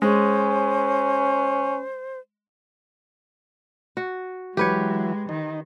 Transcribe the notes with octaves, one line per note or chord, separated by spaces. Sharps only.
G#3 C#4 C5
F#4
E3 F#3 G#3 G4 B4 C#5
D#3 D#4